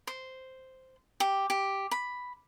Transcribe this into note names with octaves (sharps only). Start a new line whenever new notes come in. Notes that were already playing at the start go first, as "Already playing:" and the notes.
C5
G4
G4
B5